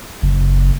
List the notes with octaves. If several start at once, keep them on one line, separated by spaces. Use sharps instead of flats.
F#1